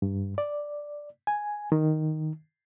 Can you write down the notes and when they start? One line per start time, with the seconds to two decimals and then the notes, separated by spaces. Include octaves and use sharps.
0.02 G2
0.38 D5
1.27 G#5
1.72 D#3